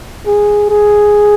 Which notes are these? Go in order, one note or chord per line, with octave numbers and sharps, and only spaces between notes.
G#4
G#4